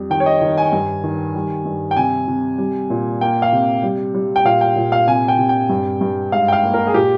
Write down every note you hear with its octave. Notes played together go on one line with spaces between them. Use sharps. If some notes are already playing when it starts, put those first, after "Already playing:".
Already playing: F2 G3
D#3 G5
C#5
D#5
D#3
G#5
G2
D#3
G3
G2
G5
C3 G#5
C3
G3
A#2
A#3 G5
F5
C3
G3
G3
G5
A#2 F5
G5
A#2
F5
C3 G#5
G5
C3
G5
G2
G2
G#2 F5
G5
F5
A#3
A#4
G#4
A#2 G4